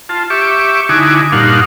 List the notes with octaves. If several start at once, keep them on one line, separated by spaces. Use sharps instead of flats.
F4 A5
G4 E5 C#6 D6
D3 D#4 E4 F#4 G#5 D6
G2 A#2 D4 D#4 F5 F#5